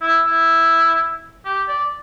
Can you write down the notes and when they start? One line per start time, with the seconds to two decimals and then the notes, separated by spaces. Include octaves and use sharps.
0.02 E4
0.26 E4
1.45 G4
1.68 D5